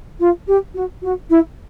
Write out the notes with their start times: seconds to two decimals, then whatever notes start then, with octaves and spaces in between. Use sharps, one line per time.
0.19 F4
0.47 G4
0.74 F#4
1.02 F#4
1.30 E4